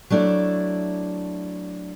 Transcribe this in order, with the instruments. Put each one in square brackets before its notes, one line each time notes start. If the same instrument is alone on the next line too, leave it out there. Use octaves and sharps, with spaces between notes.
[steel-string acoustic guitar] F#3 A3 D4 E4 D5